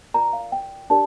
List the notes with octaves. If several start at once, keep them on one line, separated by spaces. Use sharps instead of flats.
F4 A#4 D5 A#5
F5
G5
D4 G4 A#4 D5 A5